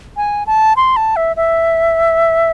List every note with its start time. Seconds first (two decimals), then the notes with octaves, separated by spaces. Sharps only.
0.17 G#5
0.47 A5
0.77 C6
0.96 A5
1.16 E5
1.37 E5